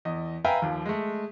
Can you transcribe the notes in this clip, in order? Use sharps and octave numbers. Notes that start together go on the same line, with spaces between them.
E2 D#5
B4 E5 F5 G5 G#5 A#5
D#2 F3
G#3 A3